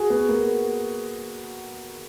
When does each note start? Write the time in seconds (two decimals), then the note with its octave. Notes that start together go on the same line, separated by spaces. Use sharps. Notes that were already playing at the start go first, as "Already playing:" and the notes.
Already playing: F#4 G#4
0.10 B3
0.29 A#3